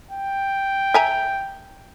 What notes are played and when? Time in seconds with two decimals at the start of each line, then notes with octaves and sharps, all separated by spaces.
0.11 G5
0.94 E5 G#5 A#5